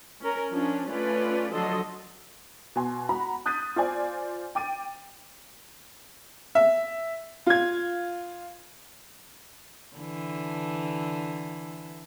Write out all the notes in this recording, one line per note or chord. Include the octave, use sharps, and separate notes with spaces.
C#4 A#4
F3 C#4 D4
A3 C#4 F4 B4 D5
D3 F3 F#3 A4 D#5 C6
B2 G#5 C6
F#4 F#5 A#5 B5
D#6 F#6 G6 A6 B6 D#7
F4 C5 D5 G#5
G5 D6 A6 D#7
E5
F4 G#6
D3 E3